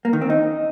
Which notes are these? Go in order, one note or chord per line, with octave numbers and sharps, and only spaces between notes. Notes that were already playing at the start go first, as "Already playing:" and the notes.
A#3
D#3
C4
D#4